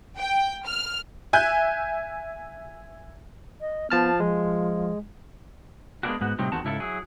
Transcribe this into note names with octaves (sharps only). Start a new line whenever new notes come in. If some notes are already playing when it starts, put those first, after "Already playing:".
G5
F6
E5 G#5 F#6 G6
D#5
F3 B3 A5 F6
F3 G#3
G#3 A#3 B3 C#4 D4 F#4
G#2 B3 F#4
A2 C3 F#3 G3 C4 D#4
E2 D#3 C4 F#4 A5
G#2 C#3 E4 G4 A4
F#3 E4 G#4